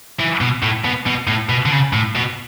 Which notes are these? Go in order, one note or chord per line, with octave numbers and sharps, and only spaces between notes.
E3
B2
A2
B2
B2
A2
B2
D3
C#3
A2
B2